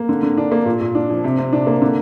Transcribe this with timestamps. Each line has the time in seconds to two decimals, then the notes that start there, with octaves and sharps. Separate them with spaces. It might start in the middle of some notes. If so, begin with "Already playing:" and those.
Already playing: A#3
0.09 D3
0.23 D3
0.38 D4
0.52 A#3
0.66 A#2
0.81 A#2
0.95 D4
1.10 F3
1.24 C3
1.38 C3
1.53 D4
1.67 A#3
1.82 D3